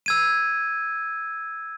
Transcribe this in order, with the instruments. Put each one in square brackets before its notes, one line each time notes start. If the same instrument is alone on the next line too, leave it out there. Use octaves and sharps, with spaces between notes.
[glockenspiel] E6 G#6 D#7